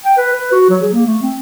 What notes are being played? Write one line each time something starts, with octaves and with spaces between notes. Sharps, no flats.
G5
B4
B4
F#4
F#3
G#4
A#3
A3
C4